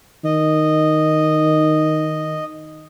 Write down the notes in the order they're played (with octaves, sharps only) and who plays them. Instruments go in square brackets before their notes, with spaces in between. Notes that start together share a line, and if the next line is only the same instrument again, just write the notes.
[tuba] D#3 [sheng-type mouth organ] D#5